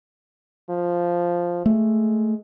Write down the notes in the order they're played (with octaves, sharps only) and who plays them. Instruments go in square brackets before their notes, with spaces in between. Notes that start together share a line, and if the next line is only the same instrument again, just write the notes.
[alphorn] F3
[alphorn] G#3 [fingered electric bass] A3